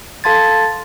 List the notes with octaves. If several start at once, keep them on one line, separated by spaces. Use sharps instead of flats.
A4 F5 A5 C6 G#6 A6